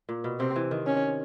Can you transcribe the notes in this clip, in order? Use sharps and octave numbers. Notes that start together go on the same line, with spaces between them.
A#2
B2
C3 C4
E3
D#3
C#4